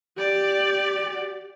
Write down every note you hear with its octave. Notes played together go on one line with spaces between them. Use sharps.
G4 D5